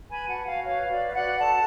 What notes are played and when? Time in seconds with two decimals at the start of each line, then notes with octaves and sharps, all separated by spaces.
0.10 B4 G#5 B5
0.28 F#4 F#5 A5
0.47 F#4 F5 G#5
0.65 B4 C#5 F5
0.84 F#4
0.90 D5
1.03 B4
1.10 F5
1.15 D5 F#5
1.21 F#4
1.39 A4 F#5 A5